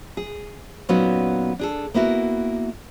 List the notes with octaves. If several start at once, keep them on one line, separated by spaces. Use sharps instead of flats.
G#4
A#2 F#3 B3 C#4 D#4 F#4
D4 G#4 A4
A#3 B3 E4 F#4